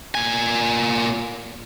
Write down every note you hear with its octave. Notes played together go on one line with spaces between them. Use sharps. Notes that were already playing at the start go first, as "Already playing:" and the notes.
A#2 G#5